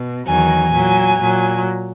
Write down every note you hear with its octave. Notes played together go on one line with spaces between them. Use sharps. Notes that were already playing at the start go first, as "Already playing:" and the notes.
Already playing: B2
E2 D#3 F#3 G#5
A#2 F#3
A#2 F#3